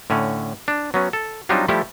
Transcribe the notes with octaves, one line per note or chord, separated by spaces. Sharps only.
A2 D3 C#4
D4
F#3 B3 C#4
A4
F#3 G3 C4 D4 D#4 F4
F3 G3 A3 E4 G4